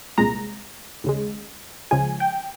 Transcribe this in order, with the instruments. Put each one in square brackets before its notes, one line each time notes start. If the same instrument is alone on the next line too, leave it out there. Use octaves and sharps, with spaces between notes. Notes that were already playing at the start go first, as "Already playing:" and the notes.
[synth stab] C2 A#2 G#3 A#5
D#2 C#3 G#3
C#2 C#3 F3 G#3 G#5
G5